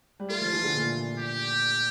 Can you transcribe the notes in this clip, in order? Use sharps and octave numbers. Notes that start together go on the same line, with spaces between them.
G3
A3 F4
F3
E3
D3
A#2
G4